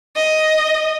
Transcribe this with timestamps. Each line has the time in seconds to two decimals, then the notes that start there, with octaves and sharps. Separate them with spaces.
0.16 D#5